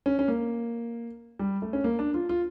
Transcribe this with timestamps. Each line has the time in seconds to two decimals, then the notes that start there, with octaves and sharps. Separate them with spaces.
0.06 C#4
0.19 C#4
0.28 A#3
1.39 G3
1.62 A3
1.73 C#4
1.84 A#3
1.99 D4
2.14 F4
2.29 F4